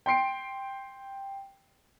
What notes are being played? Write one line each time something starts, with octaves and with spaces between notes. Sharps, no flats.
G5 C6 C7 D7